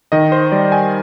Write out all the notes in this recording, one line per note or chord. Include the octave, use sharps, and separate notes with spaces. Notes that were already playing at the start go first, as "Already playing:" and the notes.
D#3 D#5
C5
G3 D5
G#5